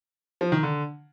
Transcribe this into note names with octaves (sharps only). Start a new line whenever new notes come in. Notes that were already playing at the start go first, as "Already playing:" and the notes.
F3
D#3
D3